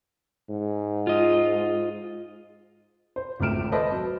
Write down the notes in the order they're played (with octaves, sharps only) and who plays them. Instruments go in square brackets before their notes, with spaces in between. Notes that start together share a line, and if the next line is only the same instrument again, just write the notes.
[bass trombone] G#2
[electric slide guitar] F4 D#5
[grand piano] C5
G#1 C#2 A3 F6 D7 E7
A4 B4 C5 D#5 A5
F#3